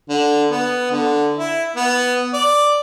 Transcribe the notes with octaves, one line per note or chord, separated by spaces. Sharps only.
D3
B3
D3
E4
B3
D5